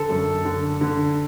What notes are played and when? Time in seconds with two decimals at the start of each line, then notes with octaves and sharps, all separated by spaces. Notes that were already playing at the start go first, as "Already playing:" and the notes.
Already playing: D3 A4
0.09 F#2
0.45 D3
0.81 D3